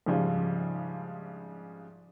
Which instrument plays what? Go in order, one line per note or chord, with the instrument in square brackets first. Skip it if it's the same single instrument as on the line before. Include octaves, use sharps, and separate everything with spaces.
[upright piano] A#1 G#2 C#3 F3 G3